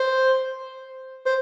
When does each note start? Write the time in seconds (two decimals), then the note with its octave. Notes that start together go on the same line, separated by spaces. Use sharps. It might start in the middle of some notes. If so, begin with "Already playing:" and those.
Already playing: C5
1.26 C5